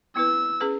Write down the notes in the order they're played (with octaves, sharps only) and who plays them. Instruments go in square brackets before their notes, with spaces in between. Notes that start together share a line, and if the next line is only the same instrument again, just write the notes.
[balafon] B3 E4 B4 [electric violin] E6
[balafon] C#4 G#4 B4